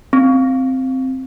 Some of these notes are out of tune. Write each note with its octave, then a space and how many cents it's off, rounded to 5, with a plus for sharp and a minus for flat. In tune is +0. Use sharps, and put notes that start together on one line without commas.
C4 +0